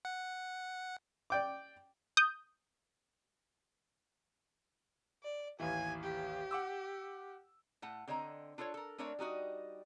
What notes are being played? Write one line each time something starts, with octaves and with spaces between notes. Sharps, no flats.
F#5
D5 G5 D6
D#6 G6
D5
A1 D#2 E3 G#5
G4
F#5 D6 E6
A2 A3 F#5
D3 C4 C#5 D#5 A#5
D4 F4 A4 B4 C#5
A4 A#4
A3 C4 D4 A#4 C#5 E5
G3 D#4 F#4 D#5